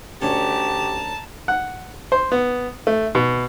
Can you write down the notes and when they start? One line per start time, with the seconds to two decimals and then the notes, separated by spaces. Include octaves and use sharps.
0.22 D2 C#4 G4 A5 A#5
1.48 F#5
2.12 C5
2.32 B3
2.87 A3
3.15 B2